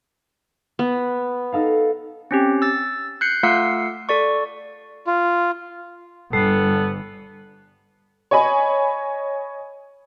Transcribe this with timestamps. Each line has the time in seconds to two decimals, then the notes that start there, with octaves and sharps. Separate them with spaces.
0.79 B3
1.52 D#4 A4 F5
2.31 C4 C#4 G4
2.62 E6 A6
3.21 F#6 G6 C7 C#7
3.43 A3 F4 F5 F#5 E6 C7
4.09 A4 D5 C#6
5.07 F4
6.33 G1 G3 B3 A4
8.31 C#5 D#5 G#5 B5